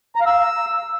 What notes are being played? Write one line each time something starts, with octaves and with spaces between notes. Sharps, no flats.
A#5
F5
E6